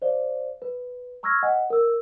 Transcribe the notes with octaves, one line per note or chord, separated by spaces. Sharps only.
C5 D5 F5
B4
A#5 C#6 E6 F6 G#6 A#6
D#5 F#5 G#5
A#4 E6